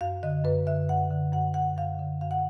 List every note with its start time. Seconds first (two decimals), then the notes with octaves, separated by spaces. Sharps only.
0.01 F#2 F5
0.23 D3 D#5
0.44 F#2 B4
0.67 D3 E5
0.89 F#2 F#5
1.11 D3
1.33 F#2 F#5
1.54 D3 F#5
1.77 F#2 F5
1.99 D3
2.21 F#2 F5
2.31 F#5